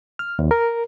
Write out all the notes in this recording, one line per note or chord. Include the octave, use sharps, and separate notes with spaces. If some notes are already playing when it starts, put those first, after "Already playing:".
F6
D#2
A#4